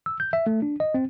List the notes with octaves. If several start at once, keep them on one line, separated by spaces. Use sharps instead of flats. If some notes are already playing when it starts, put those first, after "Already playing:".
E6
G6
E5
A3
D4
D#5
C4